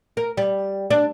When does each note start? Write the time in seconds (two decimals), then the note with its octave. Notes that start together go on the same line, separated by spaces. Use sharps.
0.17 A#4
0.37 G3
0.91 D4